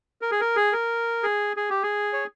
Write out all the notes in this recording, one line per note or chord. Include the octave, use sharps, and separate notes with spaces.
A#4
G#4
A#4
G#4
A#4
G#4
G#4
G4
G#4
C#5